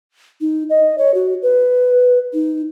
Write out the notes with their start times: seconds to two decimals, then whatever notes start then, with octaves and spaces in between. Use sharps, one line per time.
0.41 D#4
0.70 D#5
0.98 C#5
1.14 F#4
1.42 B4
2.34 D#4